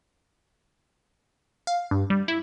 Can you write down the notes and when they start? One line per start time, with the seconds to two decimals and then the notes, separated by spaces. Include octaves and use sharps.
1.67 F5
1.91 G2
2.10 G3
2.28 E4